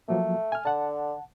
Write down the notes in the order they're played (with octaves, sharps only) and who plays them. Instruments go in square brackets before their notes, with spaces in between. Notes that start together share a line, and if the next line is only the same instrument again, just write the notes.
[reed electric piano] F3 F#3 A#3 [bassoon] A3
[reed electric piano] G#5 F6
[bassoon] D3 [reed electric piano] F#5 A5